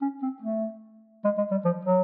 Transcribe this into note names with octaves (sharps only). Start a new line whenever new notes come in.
C#4
C4
A3
G#3
G#3
G3
F3
F#3